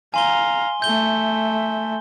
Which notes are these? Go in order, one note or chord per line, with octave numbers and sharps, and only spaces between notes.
F5 G#5 A#5 C6 G7
A3 E5 G6 G7